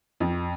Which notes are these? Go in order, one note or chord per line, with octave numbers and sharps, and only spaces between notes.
F2